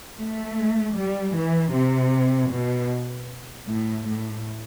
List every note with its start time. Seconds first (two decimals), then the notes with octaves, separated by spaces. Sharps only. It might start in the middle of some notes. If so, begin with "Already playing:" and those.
0.18 A3
0.96 G3
1.35 E3
1.73 C3
2.51 B2
3.67 A2
4.06 A2